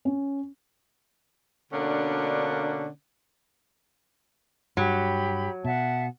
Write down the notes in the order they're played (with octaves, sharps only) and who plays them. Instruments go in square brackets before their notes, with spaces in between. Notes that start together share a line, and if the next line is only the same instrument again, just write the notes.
[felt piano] C#4
[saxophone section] B2 D3 A#3 C#4 D4
[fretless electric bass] G2 [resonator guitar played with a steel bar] F#3 [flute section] G4 B5
[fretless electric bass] B2 [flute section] E5 F#5 A5